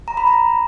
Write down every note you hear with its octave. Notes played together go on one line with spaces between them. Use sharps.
A#5
B5
A#5